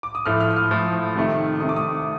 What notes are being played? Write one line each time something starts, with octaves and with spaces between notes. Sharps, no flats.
D6
D#6
A2 F3 A3 F6
F6
D#6
F6
A2 F3 A3
C3 D#3 A3
C3 D#3 A3 D#6
D6
D#6